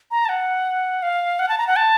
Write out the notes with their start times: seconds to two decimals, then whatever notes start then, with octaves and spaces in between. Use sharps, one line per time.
0.11 A#5
0.25 A5
0.29 F#5
1.02 F5
1.39 F#5
1.49 A5
1.58 A#5
1.67 F#5
1.76 A5